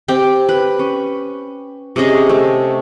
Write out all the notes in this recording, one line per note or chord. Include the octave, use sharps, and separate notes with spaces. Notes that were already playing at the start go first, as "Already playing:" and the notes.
C4 G4 G5
B4
C#4
C3 C#4 G#4 D#5
A3